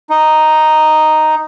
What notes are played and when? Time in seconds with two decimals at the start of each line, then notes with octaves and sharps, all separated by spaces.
0.10 D#4